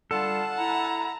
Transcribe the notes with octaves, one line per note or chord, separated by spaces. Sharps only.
D3 G3 F4 A4 F#5 A5
E4 A#5